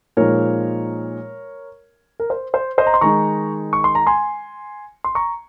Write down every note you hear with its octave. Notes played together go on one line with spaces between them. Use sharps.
A#2 F3 G#3 D#4 A#4 C#5
A#4
C5
C5
C5 D#5
A#5
C6
D#3 G#3 D#4 A#5 C#6
C#6
C6
A#5
G#5 C6
C6
A#5 C#6